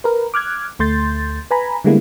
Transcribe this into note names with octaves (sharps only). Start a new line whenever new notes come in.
A#4 B4
D6 F6 F#6 G#6
D2 A3 C6 G6 A6
B4 G#5 A#5 B5
D3 G3 G#3 A#3 B3 E4